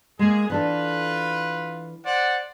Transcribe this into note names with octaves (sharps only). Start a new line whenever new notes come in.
G#3 A#3 G#4
E3 D4 F4 A4 B4
C5 D5 F#5